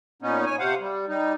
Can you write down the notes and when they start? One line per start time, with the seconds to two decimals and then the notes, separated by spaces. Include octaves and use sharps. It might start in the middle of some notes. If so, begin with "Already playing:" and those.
0.22 A#2 B3 C#4 D#4
0.46 C#5 G#5
0.59 C3 C5 F5 F#5
0.81 G3
1.08 G3 D#4